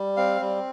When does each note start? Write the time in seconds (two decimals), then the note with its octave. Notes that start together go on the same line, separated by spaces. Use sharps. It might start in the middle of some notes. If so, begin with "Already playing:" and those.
Already playing: G3
0.17 C4 F5
0.41 G3